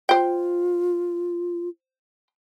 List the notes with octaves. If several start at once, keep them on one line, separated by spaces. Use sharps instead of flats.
F4 C5 G5